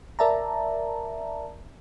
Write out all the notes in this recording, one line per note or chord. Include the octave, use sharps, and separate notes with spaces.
A#4 D5 E5 A5 A#5